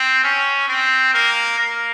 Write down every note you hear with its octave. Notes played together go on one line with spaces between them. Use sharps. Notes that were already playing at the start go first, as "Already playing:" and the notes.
Already playing: C4
C#4
C4
A#3
A#3